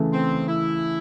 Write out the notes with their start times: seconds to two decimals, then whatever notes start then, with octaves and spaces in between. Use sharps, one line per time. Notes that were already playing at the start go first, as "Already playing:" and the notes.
Already playing: C#3 E3 A3
0.13 C4
0.48 E4